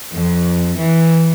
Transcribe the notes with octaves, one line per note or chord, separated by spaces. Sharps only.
F2
E3